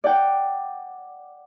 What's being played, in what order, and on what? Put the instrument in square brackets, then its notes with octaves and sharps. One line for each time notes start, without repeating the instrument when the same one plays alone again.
[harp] D5 F#5 G5